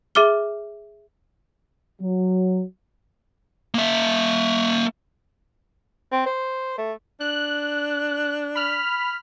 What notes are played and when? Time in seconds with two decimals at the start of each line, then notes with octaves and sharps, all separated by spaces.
0.15 G#4 E5 D6 F6 G7
2.01 F#3
3.75 A#3 E5
6.12 C4
6.26 C5
6.78 A3
7.20 D4 F#6
8.55 B5 F6